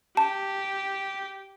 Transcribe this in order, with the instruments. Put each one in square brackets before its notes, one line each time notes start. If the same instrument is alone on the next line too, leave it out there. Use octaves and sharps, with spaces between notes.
[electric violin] G4 [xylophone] A5